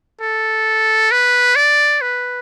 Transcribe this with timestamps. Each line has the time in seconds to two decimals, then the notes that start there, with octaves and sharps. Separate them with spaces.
0.21 A4
1.12 B4
1.56 D5
2.01 B4